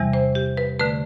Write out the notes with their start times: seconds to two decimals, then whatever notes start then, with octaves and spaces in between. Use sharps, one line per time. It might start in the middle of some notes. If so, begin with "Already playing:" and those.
Already playing: E2 C3 E3 G3
0.13 C5
0.35 G4
0.57 B4
0.79 D3 A3 B4